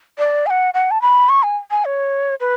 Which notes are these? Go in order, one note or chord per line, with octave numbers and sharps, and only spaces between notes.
D5
G#5
F#5
F#5
A5
B5
C#6
G#5
G#5
C#5
B4